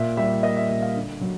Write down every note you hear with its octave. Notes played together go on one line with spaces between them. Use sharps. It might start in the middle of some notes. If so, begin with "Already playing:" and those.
Already playing: A#2 E5
G3 E5
A#3 D#5
E5
A#2 E5
F5
D3
F#3